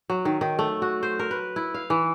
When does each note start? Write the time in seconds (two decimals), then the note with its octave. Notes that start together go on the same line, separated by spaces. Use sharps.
0.10 F#3
0.25 D#3
0.41 D#3
0.59 A3
0.82 F#4
1.03 C5
1.19 A#4
1.31 B4
1.56 E4
1.74 F5
1.90 E3